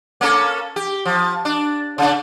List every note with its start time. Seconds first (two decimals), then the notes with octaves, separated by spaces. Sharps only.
0.21 A#3 C#4 A4
0.76 G4
1.05 F3
1.45 D4
1.98 C#3 D4